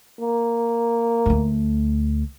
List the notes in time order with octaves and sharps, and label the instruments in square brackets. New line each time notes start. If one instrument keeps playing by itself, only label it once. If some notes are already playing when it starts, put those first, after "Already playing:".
[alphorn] A#3
[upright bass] D2 A3